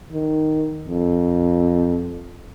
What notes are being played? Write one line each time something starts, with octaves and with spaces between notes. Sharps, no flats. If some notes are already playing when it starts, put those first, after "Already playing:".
D#3
F2